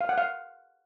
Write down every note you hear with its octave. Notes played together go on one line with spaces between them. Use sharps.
F5
F#5
F5